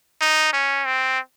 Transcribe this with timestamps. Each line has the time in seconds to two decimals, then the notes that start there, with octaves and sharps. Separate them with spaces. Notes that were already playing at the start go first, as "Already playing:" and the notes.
0.21 D#4
0.53 C#4
0.85 C4